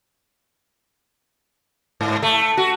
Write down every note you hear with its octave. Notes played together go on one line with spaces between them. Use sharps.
G#2
A3
F#4